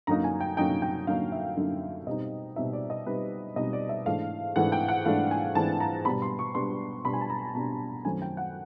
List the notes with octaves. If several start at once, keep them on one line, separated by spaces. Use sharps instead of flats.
F#2 D3 F#3 A#3 D#4 A#5
G#5
G5
F#2 D3 F#3 A#3 D#4 G5
G5
F#2 D3 F#3 A#3 D#4 F5
E5
F#2 D3 F#3 A#3 D#4
B2 G3 C4 D#4 D#5
B2 G3 C4 D#4 E5
D5
D#5
B2 G3 C4 D#4 B4
B2 G3 C4 D#4 D#5
D5
E5
G#2 E3 A3 D4 F5
G#2 E3 A3 D4 F#5
G5
F#5
G#2 E3 A3 D4 F5
G#5
G#2 E3 A3 D4 A5
A#5
B2 G3 B3 D4 B5
C6
C#6
B2 G3 B3 D4 C6
B2 G3 B3 D4 B5
G#5
A5
A#5
B2 G3 B3 D4 A5
F#2 D#3 F#3 A3 C4 G#5
G5
F#5